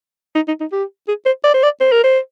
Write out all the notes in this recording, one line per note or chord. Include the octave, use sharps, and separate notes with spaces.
D#4
D#4
D#4
G4
G#4
C5
D5
C5
D5
C5
A#4
C5